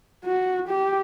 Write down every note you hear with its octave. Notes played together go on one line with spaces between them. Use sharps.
F#4
G4